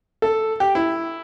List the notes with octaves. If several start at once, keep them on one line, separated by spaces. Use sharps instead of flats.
A4
G4
E4